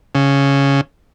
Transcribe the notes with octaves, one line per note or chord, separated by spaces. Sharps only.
C#3